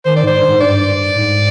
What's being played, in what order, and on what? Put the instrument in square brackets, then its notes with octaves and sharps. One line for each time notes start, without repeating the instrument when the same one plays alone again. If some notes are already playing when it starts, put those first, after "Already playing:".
[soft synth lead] D#3 [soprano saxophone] C5
[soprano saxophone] D5
[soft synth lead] G#2 [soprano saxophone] C5
[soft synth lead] G2
G#2
[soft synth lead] G2 [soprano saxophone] D5
[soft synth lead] G#2